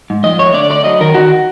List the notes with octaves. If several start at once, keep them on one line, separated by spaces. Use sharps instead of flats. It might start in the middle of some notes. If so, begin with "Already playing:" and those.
G#2
F3 D#5
A3 C#5
D3 D5
A3 D5
F#3 D#5
D#3 A#4
D#3 F#4